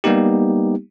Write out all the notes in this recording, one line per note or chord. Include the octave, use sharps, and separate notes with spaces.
G3 A#3 B3 D#4 G4